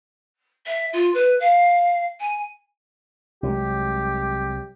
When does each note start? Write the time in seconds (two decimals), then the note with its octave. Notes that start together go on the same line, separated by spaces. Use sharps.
0.66 E5
0.93 F4
1.14 B4
1.40 F5
2.20 G#5
3.43 C2 F#3 G#3 G4